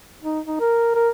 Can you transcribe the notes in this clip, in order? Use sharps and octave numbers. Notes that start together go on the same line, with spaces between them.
D#4
D#4
A#4
A#4